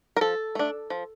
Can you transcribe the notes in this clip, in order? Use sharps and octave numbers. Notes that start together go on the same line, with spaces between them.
A#4
F3 A4
A3 D4
F3